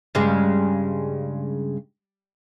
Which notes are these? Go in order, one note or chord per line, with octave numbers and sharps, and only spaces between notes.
G2 C#3 G#3